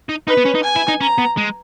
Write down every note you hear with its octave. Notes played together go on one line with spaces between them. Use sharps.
D#4
D#4 B4
B3
C#4
D#4
G#5
E4
D#4
C#4 A#5
B3
G#3